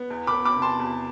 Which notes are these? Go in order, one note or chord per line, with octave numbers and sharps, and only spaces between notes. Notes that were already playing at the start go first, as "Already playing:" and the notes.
Already playing: B3
E2
B5 D6
B3
B5 D6
C3
A5 C6
E2